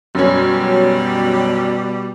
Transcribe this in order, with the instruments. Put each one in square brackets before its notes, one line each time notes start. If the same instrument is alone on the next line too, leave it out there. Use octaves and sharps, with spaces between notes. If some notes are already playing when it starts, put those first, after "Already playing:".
[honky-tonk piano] F#2 C#4 [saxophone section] B2 G3